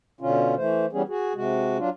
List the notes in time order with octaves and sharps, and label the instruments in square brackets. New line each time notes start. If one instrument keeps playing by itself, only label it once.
[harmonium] B2 D3 C#4 F4
E3 A3 C5
E3 G3 B3 C#4 G#4
F#4 G#4
C3 G#3 F#4
F#3 D4 F4